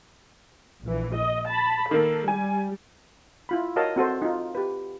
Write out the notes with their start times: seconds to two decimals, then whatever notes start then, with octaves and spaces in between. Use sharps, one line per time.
0.84 A#1 E3
1.15 D#5
1.49 A5 B5
1.91 D#3 A#3 A4
2.28 G3 G#5
3.49 E4 F4 B5
3.76 F#4 A#4 C#5 D#5 F5 A5
3.96 C4 F#4 A4 C5
4.22 D#4 F4
4.55 G4 B4